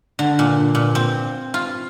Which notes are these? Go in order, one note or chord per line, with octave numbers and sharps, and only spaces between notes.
D3
A#2
A#2
C4
F4